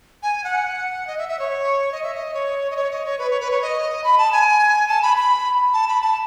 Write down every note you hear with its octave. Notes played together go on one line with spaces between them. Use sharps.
G#5
F#5
D#5
E5
E5
C#5
D#5
E5
D#5
C#5
D#5
C#5
D#5
C#5
B4
C#5
B4
C#5
D#5
B5
A5
G#5
A5
B5
B5
A5
B5
A5